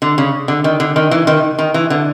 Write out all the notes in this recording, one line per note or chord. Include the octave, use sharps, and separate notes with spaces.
D3
C#3
D3
D#3
D3
D#3
E3
D#3
D#3
E3
D3